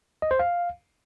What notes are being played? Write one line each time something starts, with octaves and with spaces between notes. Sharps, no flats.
D#5
C5
F5